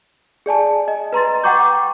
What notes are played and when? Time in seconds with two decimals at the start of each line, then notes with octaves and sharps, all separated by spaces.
0.46 G#4 D5 G#5 A5
0.88 D#5
1.13 B4 A#5 C6 A6
1.44 F#5 G5 A#5 C#6 D6 G6